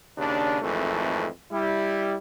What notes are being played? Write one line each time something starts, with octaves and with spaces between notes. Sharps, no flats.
D#2 C#3 D4
G#1 F2 E3 A3
G3 E4